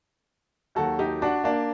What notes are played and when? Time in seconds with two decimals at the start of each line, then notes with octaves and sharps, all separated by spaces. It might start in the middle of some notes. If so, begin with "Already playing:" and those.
0.75 D#2 D#3 F#3 F#4 A4
0.99 D#4 G4
1.22 D4 F#4
1.44 A#3 D4